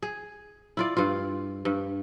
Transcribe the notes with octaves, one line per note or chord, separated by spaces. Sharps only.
G#4
E4 F4 D5
G2 F4
G2